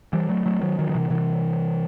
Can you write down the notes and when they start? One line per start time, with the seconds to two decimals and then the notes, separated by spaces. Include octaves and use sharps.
0.13 E3 G3
0.29 F#3 A3
0.46 F#3 A3
0.61 D#3 F#3
0.79 D#3 F#3
0.89 D#3
0.95 C3 E3
1.10 C3 E3